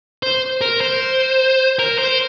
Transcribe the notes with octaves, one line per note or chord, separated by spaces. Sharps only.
C5
A#4
C5
A#4
C5